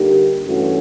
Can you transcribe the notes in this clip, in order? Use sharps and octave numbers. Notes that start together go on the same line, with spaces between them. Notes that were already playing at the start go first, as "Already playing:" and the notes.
Already playing: D3 G3 A#3 D#4 G4
G2 E3 A3 C#4 F#4